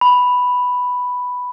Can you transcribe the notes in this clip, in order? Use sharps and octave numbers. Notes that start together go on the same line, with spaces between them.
B5